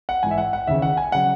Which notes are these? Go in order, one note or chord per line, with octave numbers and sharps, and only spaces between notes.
F#5
G#2 E3 G#5
E5
F#5
F#5
D#2 C#3 E3 E5
F#5
G#5
C#3 F#3 F#5